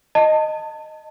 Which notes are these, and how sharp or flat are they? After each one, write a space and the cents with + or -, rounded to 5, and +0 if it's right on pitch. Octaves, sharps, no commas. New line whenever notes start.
D#5 -5 A5 +25